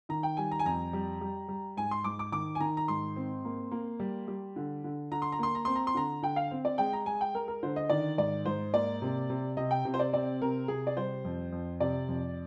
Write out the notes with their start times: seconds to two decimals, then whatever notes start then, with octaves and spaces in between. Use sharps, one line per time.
0.09 D#3 A#5
0.23 G5
0.37 G3 G#5
0.51 A#5
0.59 G#5
0.65 F2 A#5
0.93 G3
1.21 G3
1.48 G3
1.77 G#2 G#5
1.91 C6
2.04 G#2 D6
2.19 D6
2.32 D#3 D6
2.55 G#5
2.60 D#3 A#5
2.77 A#5
2.88 G#2 C6
3.16 C4
3.45 A#3
3.71 A#3
4.00 G3
4.28 G3
4.56 D3
4.84 D3
5.11 D3 A#5
5.22 C6
5.32 A#5
5.39 A#3 C6
5.55 A#5
5.65 C4 C6
5.76 A#5
5.87 C6
5.94 D3 A#5
6.22 D3 G5
6.36 F5
6.51 C4
6.65 D5
6.78 G#3 G5
6.93 A#5
7.06 G#3 G#5
7.21 G5
7.34 G#3 A#4
7.48 A#4
7.63 D3 C5
7.76 D#5
7.89 D#3 D5
8.17 G#2 D5
8.46 G#2 C5
8.74 A#3 D5
9.02 C3
9.30 C3
9.57 C3 D#5
9.71 G5
9.85 C3
9.94 C5
10.00 D5
10.13 C4 D5
10.42 C3 A#4
10.68 C3 G#4
10.87 D5
10.97 G3 C5
11.24 F2
11.52 F2
11.80 C3 D5
12.08 F2